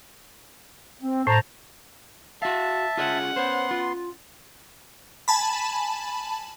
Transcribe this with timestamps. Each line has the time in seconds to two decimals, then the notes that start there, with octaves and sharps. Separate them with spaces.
1.01 C4
1.27 A2 C5 A5 A#5
2.42 F#4 E5 F5 A5
2.97 C#4 F4 G#4 D#5 F#5
3.36 B3 C5 C#5 C6
3.71 F4
5.28 G#5 A5 B5